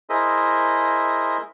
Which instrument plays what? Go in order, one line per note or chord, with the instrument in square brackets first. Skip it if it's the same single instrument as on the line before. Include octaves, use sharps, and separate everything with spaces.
[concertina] E4 G#4 A#4 C5 D#5 E5